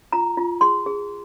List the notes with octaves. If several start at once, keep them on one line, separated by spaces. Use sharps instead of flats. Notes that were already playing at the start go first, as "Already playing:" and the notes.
F4 A#5
F4
G#4 C6
G#4